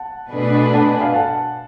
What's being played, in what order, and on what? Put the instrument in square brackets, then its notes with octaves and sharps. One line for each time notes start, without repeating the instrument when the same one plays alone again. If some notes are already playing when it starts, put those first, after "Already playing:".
Already playing: [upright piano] F#5 A5
[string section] B2 A3 D4 G#4 B4
[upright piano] F#5 A5
F5 G#5
F#5 A5